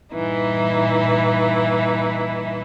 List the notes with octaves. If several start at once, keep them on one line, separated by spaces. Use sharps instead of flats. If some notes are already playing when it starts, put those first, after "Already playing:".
G2 A#2 E3 D#4 E4